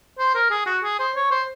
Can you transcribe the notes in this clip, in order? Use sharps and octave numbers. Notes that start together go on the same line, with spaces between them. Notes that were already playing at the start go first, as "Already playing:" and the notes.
C5
A#4
G#4
F#4
G#4
C5
C#5
C5